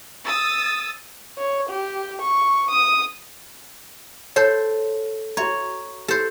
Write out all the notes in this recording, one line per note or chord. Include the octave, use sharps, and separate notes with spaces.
D#6 E6 A6
C#5
G4
C#6
D#6
A4 C5 C#5 C6
F#4 C#5 E5 A#5
G4 A4 C5